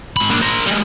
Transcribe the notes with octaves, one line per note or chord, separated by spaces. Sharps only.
G#2 B5
A#3 D4
A#4 C5
G3 G#3